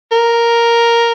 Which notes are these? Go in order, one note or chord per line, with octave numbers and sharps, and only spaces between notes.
A#4